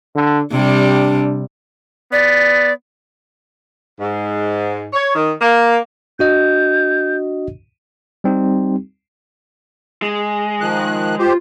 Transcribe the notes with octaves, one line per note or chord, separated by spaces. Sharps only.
D3
C3 G3 D4
B3 D5
G#2
C#5
D#3
A#3
D4 F#4 D#5 G6
G3 C4 D#4 G4
G#3
D#3 F3 F#6
F4 G4 C5